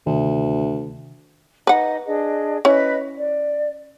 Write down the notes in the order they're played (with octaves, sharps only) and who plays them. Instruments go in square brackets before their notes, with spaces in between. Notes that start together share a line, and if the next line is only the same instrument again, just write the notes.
[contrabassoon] D2 [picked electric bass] C3 D#3
[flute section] D#4 D#5 [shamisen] B4 F#5
[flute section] D4 G#4 D#5
[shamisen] C#4 E4 [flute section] B4 D#5 B5
[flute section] D5